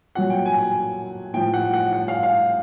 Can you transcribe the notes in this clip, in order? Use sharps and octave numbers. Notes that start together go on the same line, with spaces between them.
A#2 F#3 F#5
G5
G#5
G#5
A2 F3 G5
F#5
F#5
F#5
F5
F5